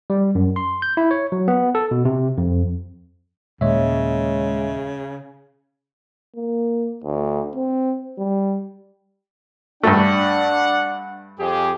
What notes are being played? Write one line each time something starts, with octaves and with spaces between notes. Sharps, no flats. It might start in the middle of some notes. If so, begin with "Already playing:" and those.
G3
F#2
C6
G6
E4
C#5
F#3
B3
A4
B2
C3
F2
D#2 A#2 C#3 G#3 C#5 D#5 E5
A#3
D2
C4
G3
G2 A3 D4 F#5
F2 G4 G#4